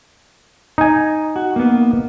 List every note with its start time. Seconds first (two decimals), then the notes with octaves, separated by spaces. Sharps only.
0.78 D#4 G#5
1.36 F#4
1.56 A#3 B3